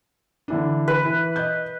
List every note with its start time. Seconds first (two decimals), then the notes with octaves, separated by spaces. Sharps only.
0.48 D3 E3 D4
0.88 B4
1.05 E3
1.36 D#5 G6